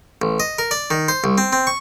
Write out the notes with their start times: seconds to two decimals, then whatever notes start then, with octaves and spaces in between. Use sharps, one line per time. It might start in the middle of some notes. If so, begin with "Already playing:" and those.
0.22 A1
0.40 D#5
0.59 A#4
0.71 D5
0.91 D#3
1.08 C5
1.24 C2
1.38 C4
1.53 C4
1.67 C#6